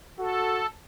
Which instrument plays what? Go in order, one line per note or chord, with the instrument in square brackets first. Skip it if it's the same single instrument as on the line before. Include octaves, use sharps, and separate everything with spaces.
[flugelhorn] F#4 [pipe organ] A4